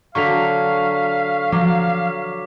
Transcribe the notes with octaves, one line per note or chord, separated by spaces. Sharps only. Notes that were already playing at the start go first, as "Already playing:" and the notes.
D3 F#3 F5 C#6 B6 F7
F3 F#3 D6